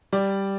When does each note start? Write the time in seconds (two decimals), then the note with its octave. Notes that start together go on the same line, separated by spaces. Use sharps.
0.13 G3 D5